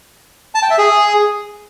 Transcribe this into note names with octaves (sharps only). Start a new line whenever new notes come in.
A5
G5
E5
G#4